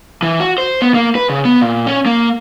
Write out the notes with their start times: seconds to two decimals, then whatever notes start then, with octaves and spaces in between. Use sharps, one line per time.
0.23 E3
0.40 F#4
0.58 C5
0.82 B3
0.94 A#3
1.15 B4
1.30 C#3
1.45 B3
1.61 A#2
1.87 C#4
2.06 A#3